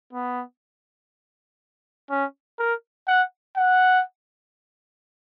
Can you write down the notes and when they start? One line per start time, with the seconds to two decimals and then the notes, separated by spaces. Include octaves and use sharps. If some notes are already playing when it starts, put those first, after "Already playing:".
0.13 B3
2.10 C#4
2.59 A#4
3.08 F#5
3.57 F#5